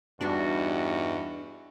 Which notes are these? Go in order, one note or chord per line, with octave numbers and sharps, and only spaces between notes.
E2 G2 G3 B3 D4 D#4 F#4